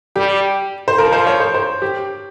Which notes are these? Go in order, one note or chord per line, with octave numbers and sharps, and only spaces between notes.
G3 G4
C5
F3 A#4
C5
C#5
C5
C5
G4